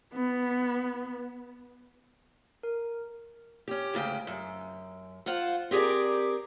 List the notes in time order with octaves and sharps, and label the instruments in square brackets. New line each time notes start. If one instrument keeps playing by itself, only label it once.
[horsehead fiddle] B3
[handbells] A#4
[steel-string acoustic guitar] C#4 G4
D2 G#2 C#3 G5
F#2
F4 C5 F#5
C4 G4 G#4 A#4 D5